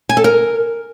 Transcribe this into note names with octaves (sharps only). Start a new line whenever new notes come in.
G#5
A4
A#4